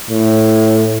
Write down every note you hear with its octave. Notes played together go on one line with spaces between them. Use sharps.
A2